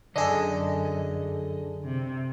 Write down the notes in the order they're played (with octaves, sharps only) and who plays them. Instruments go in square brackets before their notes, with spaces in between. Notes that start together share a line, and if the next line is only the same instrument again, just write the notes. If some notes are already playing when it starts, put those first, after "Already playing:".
[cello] F#2 [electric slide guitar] D3 D#5 [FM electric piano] D4 G#4 A4
[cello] C3